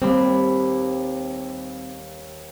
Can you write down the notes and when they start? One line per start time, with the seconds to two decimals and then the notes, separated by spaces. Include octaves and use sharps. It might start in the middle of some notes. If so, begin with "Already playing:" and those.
0.02 D#2 G3 C4 B5